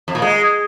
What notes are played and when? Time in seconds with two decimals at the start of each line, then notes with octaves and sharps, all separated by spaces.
0.08 F2
0.15 A#2
0.22 G#3